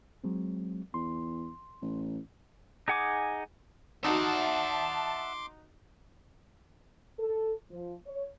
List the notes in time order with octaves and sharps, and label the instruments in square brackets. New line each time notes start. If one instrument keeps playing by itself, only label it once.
[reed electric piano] F#3 G#3 C4
[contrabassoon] E2 [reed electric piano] C6
[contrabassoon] A1
[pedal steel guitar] D#4 G#4 F#5 G#5 D6
[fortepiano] D#4 F#4 [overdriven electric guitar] E5 F#5 [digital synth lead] A5 [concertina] C6 D6
[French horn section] A4
F3
C#5